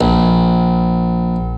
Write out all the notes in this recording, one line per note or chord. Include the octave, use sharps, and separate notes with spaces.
A#1